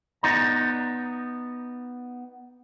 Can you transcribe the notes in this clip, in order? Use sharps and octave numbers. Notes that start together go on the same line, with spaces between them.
B3 D#4 D5 A#5